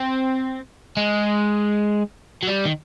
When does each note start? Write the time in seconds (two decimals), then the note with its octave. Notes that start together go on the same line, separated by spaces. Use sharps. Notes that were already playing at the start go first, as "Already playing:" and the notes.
Already playing: C4
0.97 G#3
2.43 F#3
2.47 G3
2.66 D#3